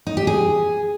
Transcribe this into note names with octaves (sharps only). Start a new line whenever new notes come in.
D#4
G4
G#4